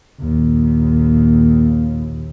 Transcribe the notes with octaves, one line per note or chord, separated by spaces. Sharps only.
A#1 D#2